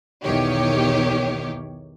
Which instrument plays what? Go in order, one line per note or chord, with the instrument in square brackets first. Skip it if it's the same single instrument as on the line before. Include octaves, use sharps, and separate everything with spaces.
[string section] B1 E2 D#3 G4 C#5